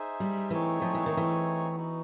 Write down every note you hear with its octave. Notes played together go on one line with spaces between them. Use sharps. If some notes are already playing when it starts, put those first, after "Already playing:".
Already playing: D#4 G#4 C5 E5
G3
E3 A3 C4 D#4 G#4 C#5
F3
E3
D#3
E3
B3 D#4 F#4